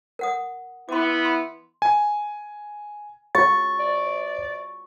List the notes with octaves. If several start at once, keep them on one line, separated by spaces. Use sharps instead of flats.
A#4 F#5 D#6
B3 E4 C6 D6
C6
G#5
C#6 A6
D5